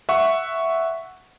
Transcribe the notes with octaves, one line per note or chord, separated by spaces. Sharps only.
E5 F#5 C#6